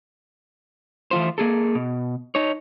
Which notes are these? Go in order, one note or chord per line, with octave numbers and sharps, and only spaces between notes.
E3 A3 F4 C5
A#3 G#4 A4
B2
D#4 C#5